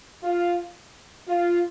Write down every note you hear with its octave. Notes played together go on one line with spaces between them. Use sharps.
F4
F4